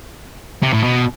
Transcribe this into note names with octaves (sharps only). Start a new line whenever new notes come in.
C3
A2
B2